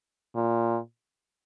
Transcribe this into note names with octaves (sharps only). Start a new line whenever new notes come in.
A#2